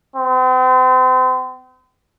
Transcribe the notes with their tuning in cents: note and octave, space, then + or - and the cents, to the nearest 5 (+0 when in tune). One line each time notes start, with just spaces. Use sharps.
C4 -40